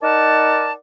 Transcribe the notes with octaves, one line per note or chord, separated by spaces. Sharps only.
D#4 A#4 D5 F#5 A5